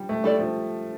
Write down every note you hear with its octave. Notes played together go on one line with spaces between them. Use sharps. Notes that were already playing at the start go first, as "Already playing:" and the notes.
Already playing: F3 G3
A3
G3 E4 A4 D5
F3